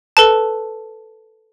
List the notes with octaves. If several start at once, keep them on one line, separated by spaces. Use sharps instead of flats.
A4 B4 A5